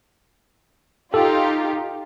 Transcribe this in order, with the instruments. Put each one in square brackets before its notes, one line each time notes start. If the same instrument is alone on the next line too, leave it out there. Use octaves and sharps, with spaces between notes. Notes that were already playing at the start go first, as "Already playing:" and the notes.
[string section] D#4 F4 G4 [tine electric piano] A4